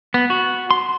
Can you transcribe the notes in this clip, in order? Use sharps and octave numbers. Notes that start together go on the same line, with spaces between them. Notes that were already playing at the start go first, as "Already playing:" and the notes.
B3
F#4
C6